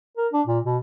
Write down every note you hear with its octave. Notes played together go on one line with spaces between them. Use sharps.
A#4
D4
A#2
B2